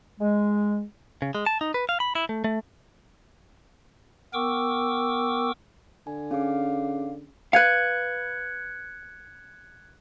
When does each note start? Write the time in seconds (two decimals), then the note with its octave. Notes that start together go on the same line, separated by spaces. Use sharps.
0.20 G#3
1.22 C#3
1.35 G#3
1.46 A5
1.61 D#4
1.74 B4
1.89 F5
2.00 B5
2.15 E4
2.29 A3
2.44 A3
4.34 B3 A#4 G5 C#6 D6 E6
6.07 D3 G#5
6.31 C#4 G#4 F5 D6
7.53 B4 F5 F#6 G#6 C#7